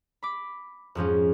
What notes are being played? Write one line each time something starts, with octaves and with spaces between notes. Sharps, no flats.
B5 D6
F2 G#2 F3 C#4